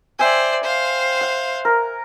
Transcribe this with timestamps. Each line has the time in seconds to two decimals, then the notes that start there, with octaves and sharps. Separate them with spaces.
0.19 C5 D5 E5 G5 G#5
0.63 C5 F5
1.21 F#5
1.65 A#4